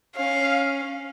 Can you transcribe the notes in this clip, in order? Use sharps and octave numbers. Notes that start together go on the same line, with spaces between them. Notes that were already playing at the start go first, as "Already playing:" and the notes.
C#4 F5